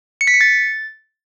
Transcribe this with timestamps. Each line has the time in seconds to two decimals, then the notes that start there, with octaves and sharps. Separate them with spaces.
0.21 C#7
0.27 B6
0.34 C#7
0.41 A6